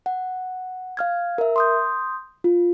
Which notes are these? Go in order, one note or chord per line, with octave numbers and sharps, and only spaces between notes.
F#5
F5 F6 G#6
A#4 E5
C6 D#6 G6
F4